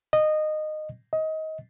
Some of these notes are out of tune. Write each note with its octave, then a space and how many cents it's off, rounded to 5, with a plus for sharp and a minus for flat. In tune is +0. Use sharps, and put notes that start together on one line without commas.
D#5 -20
D#5 +20